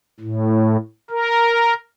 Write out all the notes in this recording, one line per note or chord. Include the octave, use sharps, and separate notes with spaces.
A2
A#4